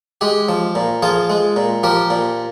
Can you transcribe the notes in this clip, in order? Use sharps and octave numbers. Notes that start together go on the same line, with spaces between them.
G#3 G4
F3
A#2
F3 F4 G#4
G#3
A#2
F3 G4 A#4
A#2